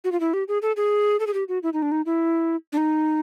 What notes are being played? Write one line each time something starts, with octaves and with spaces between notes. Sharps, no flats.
F#4
F4
E4
G4
G#4
A4
G#4
A4
G#4
G4
F#4
E4
D#4
D4
D#4
E4
D4
D#4